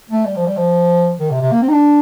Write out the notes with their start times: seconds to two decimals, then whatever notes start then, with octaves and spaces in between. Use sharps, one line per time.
0.10 A3
0.26 G3
0.36 F3
0.46 G3
0.57 F3
1.20 D#3
1.31 C3
1.41 C3
1.52 A#3
1.62 C4
1.68 D#4
1.73 D4